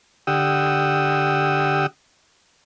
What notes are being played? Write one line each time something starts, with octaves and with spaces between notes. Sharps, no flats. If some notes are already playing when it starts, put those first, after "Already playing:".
D3 G4 F#5 G5 D#6 E6